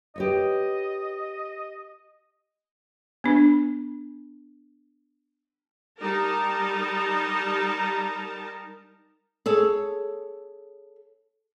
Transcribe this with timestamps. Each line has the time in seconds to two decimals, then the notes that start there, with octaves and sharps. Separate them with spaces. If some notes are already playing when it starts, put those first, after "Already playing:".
0.16 G4 B4 C#5 D#5
3.24 B3 D4
6.00 G3 D#4 A#4 A5 A#5
9.46 G#4 A4 C#5